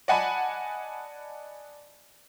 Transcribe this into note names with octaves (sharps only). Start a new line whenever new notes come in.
D5 D#5 F#5 G#5 A5 B5